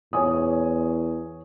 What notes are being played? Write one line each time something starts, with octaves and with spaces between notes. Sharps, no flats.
E2 C#5 G#5 D#6